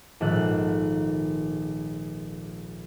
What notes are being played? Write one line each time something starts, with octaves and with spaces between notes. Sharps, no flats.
A#1 G#2 D#3 A4 F#6